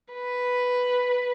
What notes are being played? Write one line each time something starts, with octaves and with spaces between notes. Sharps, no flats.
B4